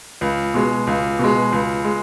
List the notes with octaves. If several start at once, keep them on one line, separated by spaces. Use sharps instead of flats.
C#2
B2 G#3
C#2
B2 G#3
C#2
G#3